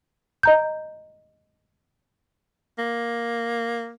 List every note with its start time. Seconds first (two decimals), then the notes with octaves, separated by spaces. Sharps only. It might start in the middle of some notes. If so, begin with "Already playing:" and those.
0.43 D#5 A#5 G6
2.79 A#3